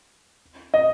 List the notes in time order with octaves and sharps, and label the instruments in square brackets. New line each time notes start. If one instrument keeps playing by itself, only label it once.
[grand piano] D#5